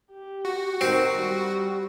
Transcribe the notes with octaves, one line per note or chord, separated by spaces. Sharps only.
G4
F#4
D#3 C4
G3